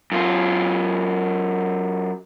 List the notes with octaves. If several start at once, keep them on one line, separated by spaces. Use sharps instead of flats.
F#2 F4